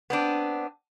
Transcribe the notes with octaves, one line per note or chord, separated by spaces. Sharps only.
B3 C4 D4